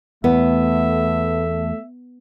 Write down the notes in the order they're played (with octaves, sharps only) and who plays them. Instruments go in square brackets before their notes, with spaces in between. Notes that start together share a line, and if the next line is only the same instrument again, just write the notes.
[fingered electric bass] E2 [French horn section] A3 [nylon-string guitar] B3 [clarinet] E5